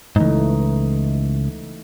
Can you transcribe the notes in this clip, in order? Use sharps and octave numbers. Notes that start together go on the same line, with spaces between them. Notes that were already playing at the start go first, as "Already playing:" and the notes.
C#2 G#2 E3 A3 D#4